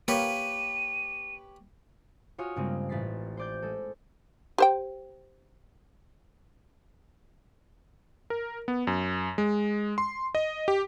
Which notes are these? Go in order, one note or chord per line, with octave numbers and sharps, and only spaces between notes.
A#3 G4 B4 C#5 D#7
F4 F#4 C#5 D#5 G#5 F6
G2 C#3 G#3 A#3 C4
A1 B4 A6 B6 C7
C5 D5 G6
G#3 A4
G4 C5 G5
A#4
B3
F#2
G#3
C6
D#5
G4